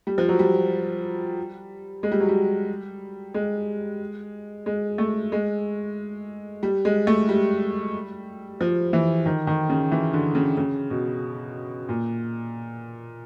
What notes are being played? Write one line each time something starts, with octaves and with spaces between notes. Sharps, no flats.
G3
F3
F#3
G3
G#3
G3
F#3
G3
G#3
G#3
A3
G#3
G3
G#3
A3
G3
F3
E3
D#3
D#3
C#3
E3
D3
C#3
C#3
B2
A#2